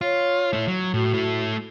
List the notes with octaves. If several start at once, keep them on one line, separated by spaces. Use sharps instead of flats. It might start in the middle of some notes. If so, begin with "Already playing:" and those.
F4 C#5
A3 E4
F#3
A2 F#4
A3 E4